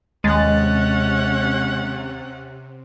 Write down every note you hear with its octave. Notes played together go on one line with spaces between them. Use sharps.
D#2 C3 G#3 C#4 F#5 A6